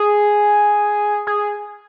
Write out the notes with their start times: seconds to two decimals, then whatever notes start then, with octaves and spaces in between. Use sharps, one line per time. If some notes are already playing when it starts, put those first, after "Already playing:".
Already playing: G#4
1.27 G#4